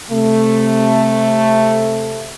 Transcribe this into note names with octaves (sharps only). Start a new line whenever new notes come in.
C3 A3